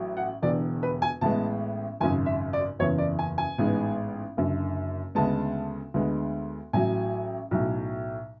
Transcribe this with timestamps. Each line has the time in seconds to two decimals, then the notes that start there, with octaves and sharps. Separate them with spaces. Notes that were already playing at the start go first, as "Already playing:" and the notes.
Already playing: A1 A2 F#3
0.17 F#5
0.42 E1 E2 D3 D5
0.83 B4
1.02 G#5
1.21 A1 A2 G#3 B3 A5
2.00 G#1 F#2 C#3 G#5
2.26 E5
2.53 D5
2.79 F#1 E2 C#3 E3 C#5
2.98 D5
3.19 G#5
3.38 G#5
3.58 A1 G#2 G#3 B3
4.37 F#1 F#2 D3
5.15 D2 C#3 G#3 B3 A5
5.94 D2 D3 G#3 B3
6.73 A1 A2 F#3 G#5
7.51 B1 A2 F#3